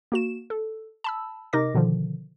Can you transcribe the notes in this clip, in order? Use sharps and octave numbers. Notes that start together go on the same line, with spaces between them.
A#3 F#4 E7
A4
A5 B5 E6
C3 D#4 A#4 D#5 D6 A#6
B2 D3 D#3 F3